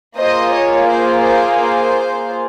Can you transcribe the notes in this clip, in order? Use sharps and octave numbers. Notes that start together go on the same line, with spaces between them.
A#3 F4 G#4 C5 D#5
C#5
C5
C5
C5